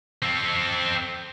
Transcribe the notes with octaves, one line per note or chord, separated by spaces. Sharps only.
C4 A4